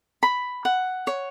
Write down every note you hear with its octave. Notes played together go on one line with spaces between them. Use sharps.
B5
F#5
C#5